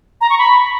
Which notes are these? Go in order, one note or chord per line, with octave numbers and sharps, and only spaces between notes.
A#5
C#6
B5